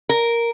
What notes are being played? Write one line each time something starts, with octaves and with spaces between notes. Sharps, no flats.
A#4